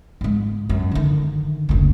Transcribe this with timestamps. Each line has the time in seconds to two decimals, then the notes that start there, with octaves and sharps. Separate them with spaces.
0.21 G#2 G#3
0.69 F#2
0.91 D3 D#3
1.69 F#1 D2